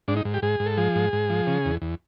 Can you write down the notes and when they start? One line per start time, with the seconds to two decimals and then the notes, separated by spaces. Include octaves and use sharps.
0.08 G#2 D4
0.17 D#4
0.25 G#2
0.34 G4
0.42 G#2 G#4
0.60 G#2
0.66 A4
0.77 F3 G#4
0.96 G#2
1.13 G#2
1.30 F3
1.47 C#3
1.65 E2
1.82 E2